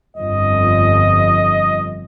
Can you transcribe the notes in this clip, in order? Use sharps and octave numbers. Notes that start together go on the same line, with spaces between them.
G1 F2 F3 D#5